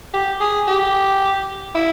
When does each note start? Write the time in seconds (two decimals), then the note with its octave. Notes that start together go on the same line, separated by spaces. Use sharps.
0.14 G4
0.40 G#4
0.68 G4
1.75 E4